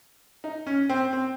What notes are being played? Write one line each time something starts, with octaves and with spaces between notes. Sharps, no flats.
D#4
C#4
C4
C4